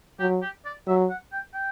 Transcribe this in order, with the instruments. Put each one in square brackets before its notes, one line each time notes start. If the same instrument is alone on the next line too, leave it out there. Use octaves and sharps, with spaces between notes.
[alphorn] F#3 [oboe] G4
[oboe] G4
D5
[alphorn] F#3 [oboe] E5
[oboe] F#5
G5
G5